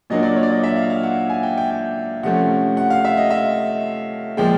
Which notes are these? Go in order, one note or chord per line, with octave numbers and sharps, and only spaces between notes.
A#2 F#3 A#3 D4 D#5
D5
C#5
D5
D#5
E5
F5
F5
F#5
G#5
G5
G5
G5
C3 F3 A3 C#4 F#5
F#5
F5
E5
D#5
E5
A#2 F3 G#3 G5